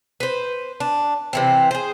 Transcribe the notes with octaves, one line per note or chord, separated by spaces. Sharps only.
B4 C5
D4
C3 E3 C4
G#4 C5